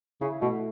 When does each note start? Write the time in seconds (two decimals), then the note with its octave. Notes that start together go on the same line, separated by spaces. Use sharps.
0.21 C#3 E4
0.41 B2 A3